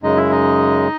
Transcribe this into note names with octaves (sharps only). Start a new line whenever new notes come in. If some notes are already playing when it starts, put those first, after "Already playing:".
F#2 C#3 G#3 D#4 D#5
E4 E5
D#4 D#5